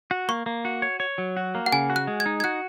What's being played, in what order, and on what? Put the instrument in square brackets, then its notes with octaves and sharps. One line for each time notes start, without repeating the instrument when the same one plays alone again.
[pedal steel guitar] F#4
[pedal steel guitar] A#3 [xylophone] C#6
[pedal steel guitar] A#3
F#4
C#5
C#5
F#3
F#4
A#3
[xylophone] F#5
[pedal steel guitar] C#3 [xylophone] G#5
[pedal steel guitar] F#4
[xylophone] F#6
[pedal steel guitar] G#3
[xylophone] G#6
[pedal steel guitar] D#4
[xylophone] G#6
[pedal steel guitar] F#4 [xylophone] F#6